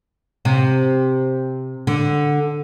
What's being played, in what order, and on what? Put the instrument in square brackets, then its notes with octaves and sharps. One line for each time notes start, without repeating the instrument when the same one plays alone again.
[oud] C3
D3